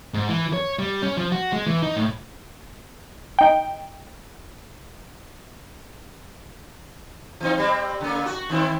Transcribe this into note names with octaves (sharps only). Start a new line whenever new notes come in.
G#2
E3
C#5
G3
C#4
F3
F#4
G#3
E3
D#4
A2
D#4 G5
E3 C4 D#4
G3 C4
C#3 A#3
F#4
D#3 C4 E4